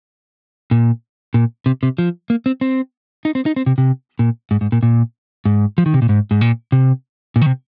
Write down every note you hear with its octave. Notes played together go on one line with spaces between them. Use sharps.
A#2
A#2
C3
C3
F3
A#3
C4
C4
D#4
C4
D#4
C4
C3
C3
A#2
G#2
G#2
A#2
A#2
G#2
F3
D#3
C3
A#2
G#2
G#2
A#2
C3
A#2
D#3
C3